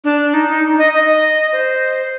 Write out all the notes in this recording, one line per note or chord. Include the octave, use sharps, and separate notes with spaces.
D4
D#4
D#4
D#5
D#5
C5